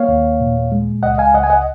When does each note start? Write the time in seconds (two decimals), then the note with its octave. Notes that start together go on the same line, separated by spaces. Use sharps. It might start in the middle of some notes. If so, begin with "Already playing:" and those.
Already playing: A#3 C#5 F5
0.08 D#2
0.40 A#2
0.72 G#3
1.03 C#2 D#5 F#5
1.18 F5 G#5
1.34 C#2 D#5 F#5
1.44 G#5
1.50 D#5 F#5